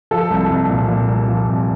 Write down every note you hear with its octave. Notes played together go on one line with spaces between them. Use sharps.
F3 A4
C2
C2
A#2
A#2
C2
F3
C2